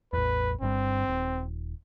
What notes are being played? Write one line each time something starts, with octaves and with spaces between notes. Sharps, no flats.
A1 E2 B4
G1 G2 G3 C4
D#1